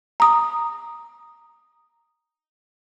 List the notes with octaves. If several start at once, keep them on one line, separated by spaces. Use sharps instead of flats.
A#5 D#6